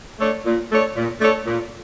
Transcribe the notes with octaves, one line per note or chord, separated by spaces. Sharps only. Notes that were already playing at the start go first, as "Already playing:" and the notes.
A3 D4 A4 C#5
A#2
A3 D4 A4 C#5
A#2
A3 D4 A4 C#5
A#2